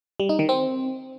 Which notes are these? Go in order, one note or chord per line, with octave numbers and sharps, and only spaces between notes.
G3
D#4
D#3
C4